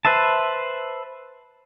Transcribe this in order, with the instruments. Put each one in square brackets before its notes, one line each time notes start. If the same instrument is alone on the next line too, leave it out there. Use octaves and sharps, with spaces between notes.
[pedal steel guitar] B4 C5 E5 A5